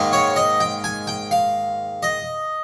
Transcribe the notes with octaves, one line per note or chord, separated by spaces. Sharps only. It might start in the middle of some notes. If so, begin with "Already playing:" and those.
Already playing: G#2 D#3 A#3
C#5
D#5
G5
G#5
G5
F5
D#5